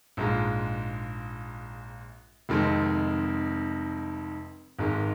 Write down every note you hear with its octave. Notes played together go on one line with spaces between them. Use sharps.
A#1 G#2 G#3 F4
F1 F2 D#3 G#3 C4
G#1 G#2 D#3 G#3